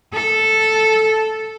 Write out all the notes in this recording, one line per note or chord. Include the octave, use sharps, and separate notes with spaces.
A4